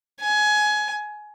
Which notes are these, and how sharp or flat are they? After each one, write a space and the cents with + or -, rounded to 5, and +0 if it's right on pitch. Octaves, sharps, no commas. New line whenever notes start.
G#5 +20